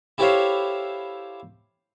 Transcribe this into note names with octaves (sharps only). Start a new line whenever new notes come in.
E4 G4 A4 C5 C#5 F5